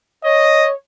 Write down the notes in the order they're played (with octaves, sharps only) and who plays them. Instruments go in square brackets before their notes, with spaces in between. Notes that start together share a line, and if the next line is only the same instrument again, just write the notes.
[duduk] C#5 [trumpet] D#5